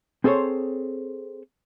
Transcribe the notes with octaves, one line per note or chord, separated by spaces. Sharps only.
C4 G#4 A4 C5 C#5